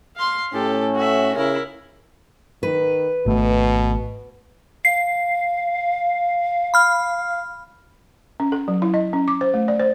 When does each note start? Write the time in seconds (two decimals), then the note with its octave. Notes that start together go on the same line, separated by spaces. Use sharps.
0.16 F5 C6
0.53 A2 C#4 G4 A4
0.95 F#4 E5
1.35 C#3 E4 A#4
2.63 D#3 B4
3.26 G#1 B2 A3
4.85 F5 C7
6.74 B5 F6
8.40 C#4
8.52 A4
8.68 F#3
8.82 E4
8.94 D#5
9.13 C#4
9.28 D6
9.41 C5
9.54 A3
9.68 D5
9.80 C5